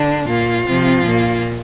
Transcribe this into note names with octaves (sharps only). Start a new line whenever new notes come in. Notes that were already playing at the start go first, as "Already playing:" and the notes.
Already playing: D3 D4
A#2 A#3 F4
C3 F3 C4
A#2 A#3